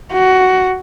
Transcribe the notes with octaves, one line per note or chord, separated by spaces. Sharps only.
F#4